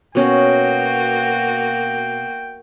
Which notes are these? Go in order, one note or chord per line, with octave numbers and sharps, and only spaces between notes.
B2 A#3 C#4 F#4 G5